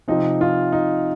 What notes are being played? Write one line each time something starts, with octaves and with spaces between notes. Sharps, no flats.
C3 F3 C4 D#4
F4
D#4